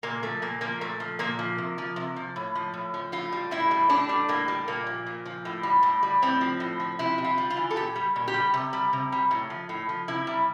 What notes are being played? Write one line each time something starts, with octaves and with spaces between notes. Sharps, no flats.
A#2 A#3
F3 A3
A#2 A#3
F3 A#3
A#2 A3
F3
A#2 A#3
F3
C3
F3
C3
F3
A2
F3
A2
F3
A2 F4
G3
A2 E4
G3
A2 D4
G3
A2 A#3
G3
A#2 A#3
F3
A#2
F3
A2
G3
A2
G3
A2 C4
F3
A2
F3
C3 E4
C3
F4
G3
F4
E3
A4
A#2 G4
G3
A#2
G4
G3
C3
G3
C3
G3
A2
F3
A2
F3
C3 E4
G3